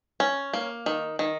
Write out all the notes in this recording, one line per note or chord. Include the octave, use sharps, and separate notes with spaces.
C#4
A#3
D#3
D#3